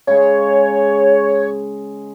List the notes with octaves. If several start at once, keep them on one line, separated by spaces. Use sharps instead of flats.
C#3 G#3 G#4 C#5